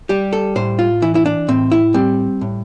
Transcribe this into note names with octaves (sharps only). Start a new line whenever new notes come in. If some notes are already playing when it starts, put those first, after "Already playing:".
G3 G4
A4
A2 C5
F4
E3 E4
E4
D4
A2 C4
E4
G3 C4
A2